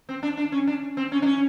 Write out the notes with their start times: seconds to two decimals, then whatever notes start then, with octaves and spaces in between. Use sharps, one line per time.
0.09 C4
0.23 D4
0.37 D4
0.52 C#4
0.67 D4
0.97 C4
1.12 C#4
1.22 D4
1.26 C#4